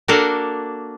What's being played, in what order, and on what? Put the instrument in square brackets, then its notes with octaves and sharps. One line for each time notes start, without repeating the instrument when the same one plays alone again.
[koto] A#3 D4 F#4 A4 A#4